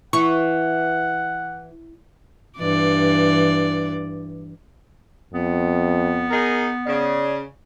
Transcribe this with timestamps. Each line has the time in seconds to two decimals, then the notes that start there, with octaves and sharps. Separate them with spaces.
0.13 E3 E4 F#5 C#6
2.58 G2 E3 D5
5.34 F2 B3
6.31 D#4 G#4 A#4
6.86 C#3 D5